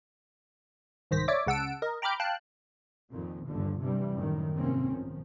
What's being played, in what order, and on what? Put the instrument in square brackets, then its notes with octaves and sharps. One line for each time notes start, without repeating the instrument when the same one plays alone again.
[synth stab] C2 G#2 D#3 C5 A#6 B6
C#5 D5 E5 D6
C#2 C#3 F#5 A5 E6 D7
A#4 D#5
G5 A#5 B5 D6 F6 G6
F5 G5 A5 F#6
[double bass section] F2 A#2 D#3
G1 D#2 D3 F3
G2 C3 E3 G3
F#2 A2 D#3
F2 G#2 C3 A#3 C4 C#4
B1 D#3 F3